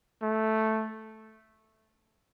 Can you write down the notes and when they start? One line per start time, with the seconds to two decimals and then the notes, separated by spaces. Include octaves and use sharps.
0.23 A3